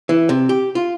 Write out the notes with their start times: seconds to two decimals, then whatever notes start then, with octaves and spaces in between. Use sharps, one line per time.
0.09 E3
0.29 C3
0.49 G4
0.75 F4